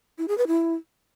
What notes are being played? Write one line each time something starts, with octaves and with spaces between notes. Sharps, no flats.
E4
G#4
B4
E4